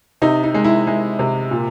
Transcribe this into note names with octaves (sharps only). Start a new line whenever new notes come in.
C3 D#4
D#4
G#3
E4
G#3
C3
A#2